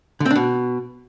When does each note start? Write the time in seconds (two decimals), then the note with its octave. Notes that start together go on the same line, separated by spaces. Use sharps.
0.20 D3
0.25 C4
0.31 D4
0.36 B2